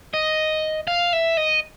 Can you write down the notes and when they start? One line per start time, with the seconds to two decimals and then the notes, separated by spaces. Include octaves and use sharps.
0.14 D#5
0.87 F5
1.13 E5
1.37 D#5